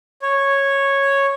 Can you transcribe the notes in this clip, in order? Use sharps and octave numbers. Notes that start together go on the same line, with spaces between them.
C#5